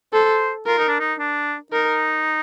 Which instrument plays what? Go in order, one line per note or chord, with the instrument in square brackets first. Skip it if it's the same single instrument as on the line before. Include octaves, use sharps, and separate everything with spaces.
[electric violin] A4 [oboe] C5
[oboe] F4 [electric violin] A#4
[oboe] D#4
D4
D#4
D4
[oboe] D#4 [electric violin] A#4